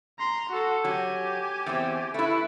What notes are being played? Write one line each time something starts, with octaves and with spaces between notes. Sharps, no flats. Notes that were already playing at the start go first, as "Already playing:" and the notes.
A#5 C6
F#4 A4
F#3 G4 G#5
E2 C4
A3 E4 B4